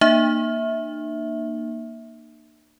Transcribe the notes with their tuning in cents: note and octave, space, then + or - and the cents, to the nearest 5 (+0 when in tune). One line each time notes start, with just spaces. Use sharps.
A#3 +0 D#4 -45 E5 -15